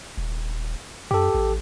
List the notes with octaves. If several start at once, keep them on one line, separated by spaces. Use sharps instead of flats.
D#1
F#2 G4 A4
A1